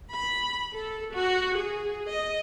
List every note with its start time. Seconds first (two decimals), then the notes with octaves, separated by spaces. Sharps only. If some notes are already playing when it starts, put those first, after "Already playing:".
0.13 B5
0.73 A4
1.15 F#4
1.55 G#4
2.10 D#5